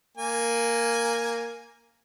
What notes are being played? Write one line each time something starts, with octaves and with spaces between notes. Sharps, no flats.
A#3 G#5